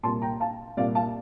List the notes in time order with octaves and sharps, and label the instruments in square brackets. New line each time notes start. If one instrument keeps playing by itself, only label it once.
[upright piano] C2 A#2 A5 C6
G5 A#5
F5 A5
C2 A#2 D5 F5
F5 A5